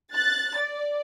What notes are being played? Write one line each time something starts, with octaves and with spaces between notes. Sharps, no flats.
F#6 A6
D5